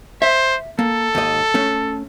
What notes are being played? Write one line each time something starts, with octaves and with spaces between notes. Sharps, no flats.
C5 E5
A#3 A4
D#2 G#2 D#5
A3 C#4